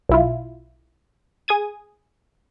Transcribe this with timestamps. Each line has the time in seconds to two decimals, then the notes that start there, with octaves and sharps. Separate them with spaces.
0.09 B1 E4 F4
1.48 G#4 D#6 G#6 D#7